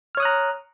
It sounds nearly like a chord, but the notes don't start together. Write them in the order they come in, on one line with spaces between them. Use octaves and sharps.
F6 C#5 D#6 F#6 A#5